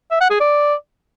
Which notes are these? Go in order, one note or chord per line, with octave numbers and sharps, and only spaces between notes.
E5
F#5
G#4
D5